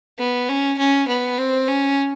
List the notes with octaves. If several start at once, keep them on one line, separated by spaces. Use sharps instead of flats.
B3
C#4
C#4
B3
C4
C#4